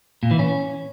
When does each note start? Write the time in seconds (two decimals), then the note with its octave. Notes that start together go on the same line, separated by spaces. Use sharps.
0.23 A#2
0.31 E3
0.39 C#4